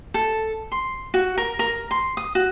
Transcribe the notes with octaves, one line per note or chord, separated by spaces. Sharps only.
A4
C6
F#4
A#4
A#4
C6
D#6
F#4